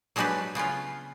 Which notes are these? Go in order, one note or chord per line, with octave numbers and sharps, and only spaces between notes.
F#3 G#3 D4 F#4 G4 B4
C#3 B3 C#4 F4